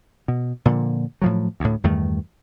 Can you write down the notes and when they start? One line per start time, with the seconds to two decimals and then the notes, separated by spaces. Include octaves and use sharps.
0.28 B2
0.65 A#2 D3 F3
1.22 A2 F3 F#3
1.60 D2 A2
1.84 E2 G2 D#3 A3